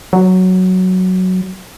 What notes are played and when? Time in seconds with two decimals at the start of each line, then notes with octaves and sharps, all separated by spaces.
0.13 F#3